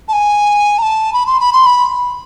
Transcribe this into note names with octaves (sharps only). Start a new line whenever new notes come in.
A5
G#5
A#5
A5
B5
C6
B5
C6
B5